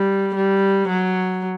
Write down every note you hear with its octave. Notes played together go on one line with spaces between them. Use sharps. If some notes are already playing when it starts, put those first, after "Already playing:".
Already playing: G3
G3
F#3